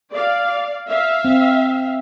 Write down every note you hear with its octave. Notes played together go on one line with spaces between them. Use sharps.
D5 F5
E5 F5
C4